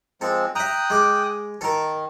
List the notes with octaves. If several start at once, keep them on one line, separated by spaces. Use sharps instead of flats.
F3 G#3 C4 A4
E5 G5 A#5 D#6 F#6
G#3 D6
D#3 A4 A#4